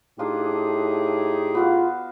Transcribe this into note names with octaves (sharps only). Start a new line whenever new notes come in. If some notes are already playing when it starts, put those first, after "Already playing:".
A2 D4 D#4 F4 G4 G#4
B3 F4 F#4 F5